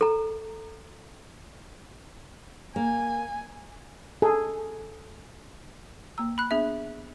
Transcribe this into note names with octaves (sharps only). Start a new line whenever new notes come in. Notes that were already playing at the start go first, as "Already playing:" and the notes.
A4 A#5
A#3 G#5
G#4 A4
A#3 A#5 E6
B5 F#6
B3 D4 G#4 E5